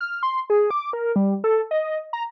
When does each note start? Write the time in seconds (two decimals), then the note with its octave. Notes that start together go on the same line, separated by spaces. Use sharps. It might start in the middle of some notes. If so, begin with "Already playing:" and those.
0.01 F6
0.23 C6
0.50 G#4
0.71 D6
0.93 A#4
1.16 G3
1.44 A4
1.71 D#5
2.13 A#5